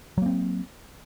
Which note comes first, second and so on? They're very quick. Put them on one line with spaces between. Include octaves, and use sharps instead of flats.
F#3 A#3 C4